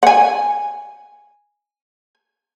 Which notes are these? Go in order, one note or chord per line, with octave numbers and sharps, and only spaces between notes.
F#5 G#5